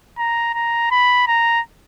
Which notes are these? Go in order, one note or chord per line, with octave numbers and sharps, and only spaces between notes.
A#5
A#5
B5
A#5